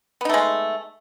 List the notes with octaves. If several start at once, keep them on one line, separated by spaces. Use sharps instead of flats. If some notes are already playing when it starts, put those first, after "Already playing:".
G#3 A3 B3 D#4